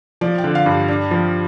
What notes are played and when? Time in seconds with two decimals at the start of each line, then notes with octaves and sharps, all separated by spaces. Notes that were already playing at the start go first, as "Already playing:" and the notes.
0.21 F3 D5
0.38 G5
0.44 D3
0.55 F5
0.66 G2
0.88 D4
1.11 F3